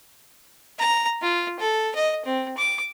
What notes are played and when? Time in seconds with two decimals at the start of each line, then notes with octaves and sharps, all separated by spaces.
0.78 A#5
1.22 F4
1.59 A4
1.95 D#5
2.25 C4
2.57 D6